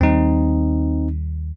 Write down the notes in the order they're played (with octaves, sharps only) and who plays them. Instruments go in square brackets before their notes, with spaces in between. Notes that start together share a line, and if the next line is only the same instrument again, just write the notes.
[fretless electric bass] D#2 G3 [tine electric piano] C4 D#4